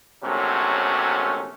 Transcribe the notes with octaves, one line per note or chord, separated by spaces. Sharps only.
A#1 C3 F#3 A3 C#4